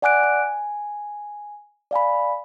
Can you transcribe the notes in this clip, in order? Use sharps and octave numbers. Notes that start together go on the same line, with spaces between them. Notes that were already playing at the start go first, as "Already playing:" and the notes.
D5 F#5 G#5 D6 F#6 D7
G#5
D5 F5 G#5 B5